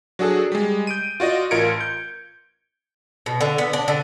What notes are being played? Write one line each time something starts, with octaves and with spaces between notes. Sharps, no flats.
F#3 D4 F#4 G#4 A4
G3 G#3
G6 D7 D#7
F4 F#4 D5 D#5
A1 F4 A#4 G#6 C#7 D7
G6
B2
D3
B3
D4
D3